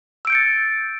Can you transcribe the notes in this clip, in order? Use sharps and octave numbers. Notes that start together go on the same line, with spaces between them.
E6 G6 A6 C#7 D7